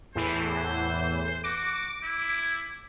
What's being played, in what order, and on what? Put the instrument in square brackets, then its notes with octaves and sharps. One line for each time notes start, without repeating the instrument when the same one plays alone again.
[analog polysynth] E2 A2 E3 [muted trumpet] C5
[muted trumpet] F#4 [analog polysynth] D6
[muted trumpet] E4